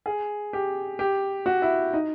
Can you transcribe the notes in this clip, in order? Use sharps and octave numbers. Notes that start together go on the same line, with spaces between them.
G#4
G4
G4
F#4
E4
D#4